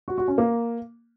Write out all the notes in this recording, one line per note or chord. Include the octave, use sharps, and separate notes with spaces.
F#4
F#4
C#4
A#3